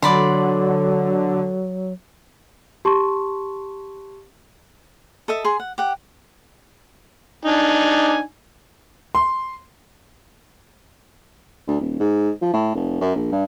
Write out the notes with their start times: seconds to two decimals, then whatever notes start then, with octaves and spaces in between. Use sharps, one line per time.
0.02 D3 F#3 D5 B5 C6
2.85 G4 A5 C6 C#6
5.28 A4 D#5 E5
5.44 G#4 C6
5.60 F#5
5.78 G4 F#5
7.45 D4 D#4 G#5
9.15 C6
11.68 D2
11.81 D#1
12.00 G#2
12.42 F3
12.54 A2
12.75 F1
13.01 F#2
13.16 A#1
13.32 G2